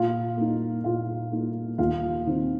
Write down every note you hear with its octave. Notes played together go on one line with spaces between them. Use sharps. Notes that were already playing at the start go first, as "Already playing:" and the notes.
Already playing: A#2 F4 F5
A#3 D#4
A#2 F4 F5
A#3 D#4
D#2 F4 F5
D#3 C4 D#4